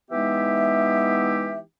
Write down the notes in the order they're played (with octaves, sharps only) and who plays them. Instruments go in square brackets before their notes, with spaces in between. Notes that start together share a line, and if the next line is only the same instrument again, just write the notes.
[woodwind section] E3 G#3 B3 D#4 G4 E5